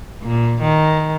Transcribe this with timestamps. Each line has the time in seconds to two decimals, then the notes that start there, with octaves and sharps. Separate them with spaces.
0.22 A#2
0.62 D#3